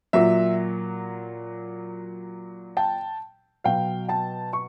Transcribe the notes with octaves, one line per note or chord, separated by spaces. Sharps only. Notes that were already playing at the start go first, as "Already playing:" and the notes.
A#2 F#3 E5
G5 A5
B2 F#3 F5 G5
G5 A5
C#6